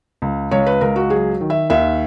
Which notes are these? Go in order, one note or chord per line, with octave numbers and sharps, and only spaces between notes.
C#2
C#2 C#5
B4
C#2 A#4
F#4
F#3 G#4
D#3
E5
D#2 E5